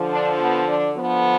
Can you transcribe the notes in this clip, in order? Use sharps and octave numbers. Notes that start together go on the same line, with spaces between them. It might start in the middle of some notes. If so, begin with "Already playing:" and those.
Already playing: D3 F3
D4
B3
D4
D3 F3 B3